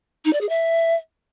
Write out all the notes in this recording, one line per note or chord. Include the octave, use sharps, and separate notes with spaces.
D#4
D5
G#4
E5